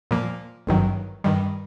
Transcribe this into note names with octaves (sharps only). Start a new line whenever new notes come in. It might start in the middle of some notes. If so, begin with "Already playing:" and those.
A#2 F3 A#3
G#1 G2 D#3 F#3
G2 D#3 G3